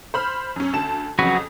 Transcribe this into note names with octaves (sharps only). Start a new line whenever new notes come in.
C5 B5 F6
F#2 C#4
D2 A5 E7
F2 C#3 F#3 F#4 B4